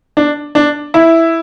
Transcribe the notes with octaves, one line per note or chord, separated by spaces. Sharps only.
D4
D4
E4